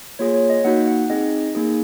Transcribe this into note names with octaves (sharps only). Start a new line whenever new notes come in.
A#3 F4 G#4 C#5
C#5
D#5
A#3 D#4 F#4 F#5
F#5
C4 D#4 G#4 D#5
A#3 D#4 G#4